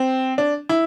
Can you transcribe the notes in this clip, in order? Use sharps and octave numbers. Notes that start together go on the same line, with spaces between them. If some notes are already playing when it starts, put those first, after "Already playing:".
Already playing: C4
D4
E4